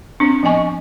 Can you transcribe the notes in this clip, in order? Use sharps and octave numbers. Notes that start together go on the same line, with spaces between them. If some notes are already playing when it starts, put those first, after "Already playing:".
C4 D4
F3 B3 D#5 G#5 C#6